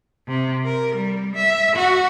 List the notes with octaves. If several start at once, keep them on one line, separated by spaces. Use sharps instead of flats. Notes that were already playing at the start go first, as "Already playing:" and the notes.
C3
A#4
G3
E5
F#4